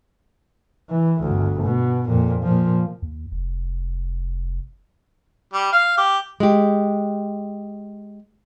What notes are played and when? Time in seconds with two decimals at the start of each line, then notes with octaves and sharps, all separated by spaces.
0.90 E3
1.21 G1 D2
1.63 B2
2.08 F2 A#2
2.43 A#2 F3
3.02 D#2
3.32 F1
5.53 G3
5.72 F5
5.97 G4
6.40 G#3 G4